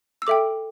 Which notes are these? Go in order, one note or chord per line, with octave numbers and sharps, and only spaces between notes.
E6
A4 E5 G5 D6